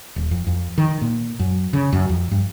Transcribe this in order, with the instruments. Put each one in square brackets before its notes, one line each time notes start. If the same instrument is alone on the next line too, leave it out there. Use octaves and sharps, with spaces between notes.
[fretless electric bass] D#1
F2
F2
D#3
A#2
F#2
C#3
F#2
F2
G2